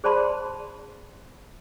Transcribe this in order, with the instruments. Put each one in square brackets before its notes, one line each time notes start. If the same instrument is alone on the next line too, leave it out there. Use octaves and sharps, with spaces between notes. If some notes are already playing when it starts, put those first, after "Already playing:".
[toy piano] G#4 C5 D5 A5 B5 C6